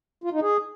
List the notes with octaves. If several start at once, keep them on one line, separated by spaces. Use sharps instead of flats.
F4
D#4
G#4